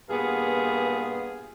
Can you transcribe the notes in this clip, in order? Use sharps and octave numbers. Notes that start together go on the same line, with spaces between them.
G2 A#2 B3 G#4 F5